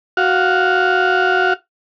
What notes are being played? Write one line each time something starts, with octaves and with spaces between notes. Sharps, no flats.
F#4 F5